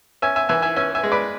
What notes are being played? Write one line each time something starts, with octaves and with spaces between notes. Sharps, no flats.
C#4 E5 G#5
E5 G#5
E3 E5 G#5
E5 G#5
C#4 E5 G#5
E5 G#5
G#3
B4 D5